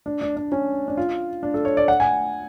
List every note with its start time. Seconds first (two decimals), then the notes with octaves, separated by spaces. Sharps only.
0.06 D4
0.21 D4
0.37 D4
0.52 C#4
0.88 D4
0.97 F4
1.43 D4
1.54 A4
1.65 C#5
1.77 D5
1.88 F#5
2.00 G#5